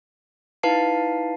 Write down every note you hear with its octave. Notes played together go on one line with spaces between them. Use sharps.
D#4 E4 B4 F5 A5 C7